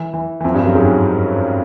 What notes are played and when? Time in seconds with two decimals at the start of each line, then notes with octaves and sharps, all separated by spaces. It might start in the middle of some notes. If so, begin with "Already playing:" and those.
Already playing: E3
0.14 E3
0.40 E3
0.44 F2 F3
0.54 G2 G3
0.65 F#2 F#3
0.75 G#2 G#3